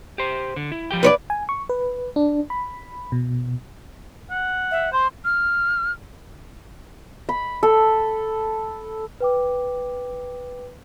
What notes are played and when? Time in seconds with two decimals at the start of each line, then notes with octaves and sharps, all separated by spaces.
0.18 G4 C5
0.56 D3
0.72 E4
0.91 F3 G4 G5
1.03 B4 C#5 D5
1.30 G#5
1.49 C#6
1.69 B4
2.16 D4
2.50 B5
3.12 B2
4.30 F#5
4.71 E5
4.92 C5 C6
5.25 F6
7.29 B5
7.63 A4
9.20 B4 G5 D6